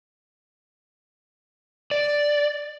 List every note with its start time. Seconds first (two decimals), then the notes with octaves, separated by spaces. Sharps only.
1.91 D5